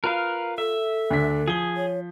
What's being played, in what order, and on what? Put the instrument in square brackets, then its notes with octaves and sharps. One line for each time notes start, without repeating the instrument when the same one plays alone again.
[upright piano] F4 [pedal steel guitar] A#4 B4 F5
[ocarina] A4 [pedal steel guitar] E5
[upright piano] D2 D4 B6
[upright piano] F3 G7 [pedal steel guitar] G#4
[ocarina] C#5